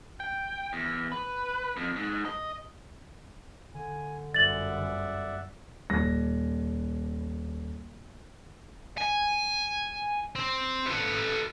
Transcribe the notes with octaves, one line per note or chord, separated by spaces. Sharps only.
G5
E2
B4
F2
G#2
D#5
D3 G#5
G1 F#2 D5 E5 F#5 A6 F#7
D#1 A#6
G#5
C4
A4 B4